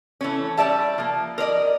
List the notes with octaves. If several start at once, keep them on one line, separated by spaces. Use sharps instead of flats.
E3 A3 C#4
G3 D5 E5 A5
F3 A#3
A#4 C5 D5 D#5